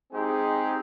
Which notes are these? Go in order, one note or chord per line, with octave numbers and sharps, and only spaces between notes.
G#3 C4 D#4 G4 G#4